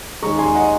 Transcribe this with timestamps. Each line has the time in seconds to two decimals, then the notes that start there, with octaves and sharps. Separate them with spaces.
0.22 D#2 D#3 G#3 A#5 C#6
0.39 G#5 C6
0.55 D#5 F#5